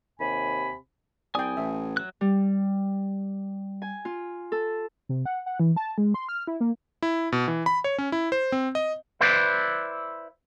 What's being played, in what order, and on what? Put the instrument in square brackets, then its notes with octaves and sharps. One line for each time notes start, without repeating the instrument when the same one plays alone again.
[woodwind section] D#2 C3 G#5 B5
[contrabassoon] C2 [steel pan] D5 G5 [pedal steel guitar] G#5 D#6
[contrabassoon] A1 [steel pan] E5
[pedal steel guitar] F#3 F#6
[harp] G3
G#5
F4
A4
[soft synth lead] C3
F#5
F#5
E3
A5
G#3
C6
F6
E4
A#3
[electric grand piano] E4
B2
E3
B5
C#5
C#4
E4
C5
C4
D#5
[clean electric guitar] E4 B4 C5 D5